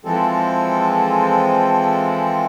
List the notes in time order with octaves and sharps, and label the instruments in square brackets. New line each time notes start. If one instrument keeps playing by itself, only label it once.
[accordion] E3 F3 G#3 C4 A4